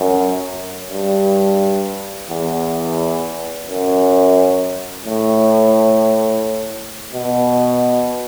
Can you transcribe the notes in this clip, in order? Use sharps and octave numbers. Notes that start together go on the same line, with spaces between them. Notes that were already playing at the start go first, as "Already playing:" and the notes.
Already playing: F#2
G2
E2
F#2
A2
B2